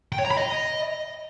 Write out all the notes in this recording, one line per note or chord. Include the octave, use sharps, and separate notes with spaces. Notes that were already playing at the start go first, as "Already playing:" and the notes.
G5
C#5
A#5
B5
D#5